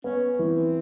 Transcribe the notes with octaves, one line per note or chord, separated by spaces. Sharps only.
B3 C#4
E3 C4